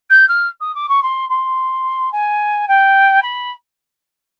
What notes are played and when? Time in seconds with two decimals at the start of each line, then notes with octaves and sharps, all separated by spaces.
0.10 G6
0.28 F6
0.60 D#6
0.75 D6
0.89 C#6
1.03 C6
1.29 C6
2.12 G#5
2.68 G5
3.22 B5